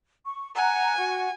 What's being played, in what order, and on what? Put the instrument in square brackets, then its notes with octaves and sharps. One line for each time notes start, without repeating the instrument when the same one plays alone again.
[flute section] C#6
[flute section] F#5 A#5 F#6 [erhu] G#5
[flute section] F#4 F#5